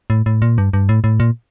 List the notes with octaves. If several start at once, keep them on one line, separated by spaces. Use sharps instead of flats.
A2
A2
A#2
G2
G2
A2
A2
A#2